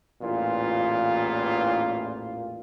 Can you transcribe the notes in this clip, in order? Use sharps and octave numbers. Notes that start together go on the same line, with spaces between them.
A1 E2 A#2 F4